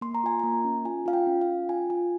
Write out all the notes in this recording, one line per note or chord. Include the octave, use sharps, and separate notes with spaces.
A#3 C6
A#5
F4 G#5
A#3 A#5
C#4
F4 G#5
F4 F5
G5
C#4
F5
F4
F4 G#5
F4 G#5